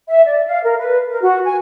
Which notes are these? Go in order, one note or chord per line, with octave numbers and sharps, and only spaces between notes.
E5
D5
F5
A#4
B4
A#4
F#4
G#5